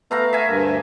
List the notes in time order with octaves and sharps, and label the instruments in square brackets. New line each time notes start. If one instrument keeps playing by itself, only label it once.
[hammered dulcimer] A3 F5 A#5 [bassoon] B3
[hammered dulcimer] E5 G#5
[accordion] D2 G2 [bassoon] A#3